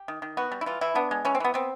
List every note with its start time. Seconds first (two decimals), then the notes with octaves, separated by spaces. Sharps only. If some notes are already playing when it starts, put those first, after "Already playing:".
Already playing: G4
0.08 D#3
0.22 D#3
0.37 B3 F#4
0.52 G3
0.61 E4
0.66 E3 F4
0.81 E3 E4
0.95 B3 D4
1.11 G#3
1.25 E3 C#4
1.35 C4
1.40 E3 B3
1.54 B3 C4